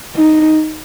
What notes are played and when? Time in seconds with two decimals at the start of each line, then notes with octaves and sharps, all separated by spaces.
0.16 D#4